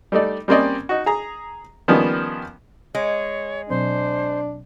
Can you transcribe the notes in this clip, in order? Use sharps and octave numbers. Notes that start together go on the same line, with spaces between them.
G3 A3 D#4 D5
G3 A#3 C4 C#4 D5 D#5
D#4 F#4
G#4 A#5
D#3 F3 G3 A#3 B3 C#4
G#3 C#5
B2 F#3 C4 D4 C5